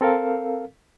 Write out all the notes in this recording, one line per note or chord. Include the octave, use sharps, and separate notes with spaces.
C4 A4 A#4 F5